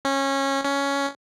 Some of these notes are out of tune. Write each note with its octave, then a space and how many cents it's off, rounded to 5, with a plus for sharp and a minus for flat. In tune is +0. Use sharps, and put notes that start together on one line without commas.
C#4 -20
C#4 +10